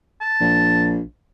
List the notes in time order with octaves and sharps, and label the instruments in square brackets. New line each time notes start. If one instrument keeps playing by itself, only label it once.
[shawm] A5
[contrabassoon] A#1